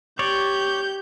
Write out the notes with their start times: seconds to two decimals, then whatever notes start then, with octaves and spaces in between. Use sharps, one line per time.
0.19 G4 C#5 D5 G6